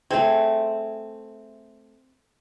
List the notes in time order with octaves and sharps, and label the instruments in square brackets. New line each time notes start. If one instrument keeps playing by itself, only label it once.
[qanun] A3 G#4 [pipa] C4